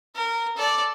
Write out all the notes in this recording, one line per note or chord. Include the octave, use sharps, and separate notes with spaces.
A#4
A4 D5